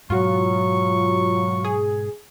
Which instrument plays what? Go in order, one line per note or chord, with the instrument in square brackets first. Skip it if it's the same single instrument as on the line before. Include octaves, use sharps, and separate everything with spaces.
[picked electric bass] G#2 B2 [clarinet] F#3 [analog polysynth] F4 F#4 [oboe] C#6
[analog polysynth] G#4